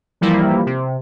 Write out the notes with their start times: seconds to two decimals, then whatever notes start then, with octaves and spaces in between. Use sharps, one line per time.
0.21 E3 F3 G3 A#3 E4
0.66 C3